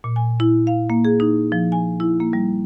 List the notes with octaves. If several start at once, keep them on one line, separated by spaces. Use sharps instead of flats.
A#2
G#5
E4
F5
A#3
G#4
D#4
F3
G#5
E4
A#3
G3